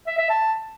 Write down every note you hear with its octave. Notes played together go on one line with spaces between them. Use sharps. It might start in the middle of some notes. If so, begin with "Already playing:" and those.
E5
E5
A5